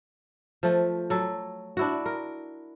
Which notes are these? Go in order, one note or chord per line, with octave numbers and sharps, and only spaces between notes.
F3 A3
F#3 A4
D4 E4 F#4
A#4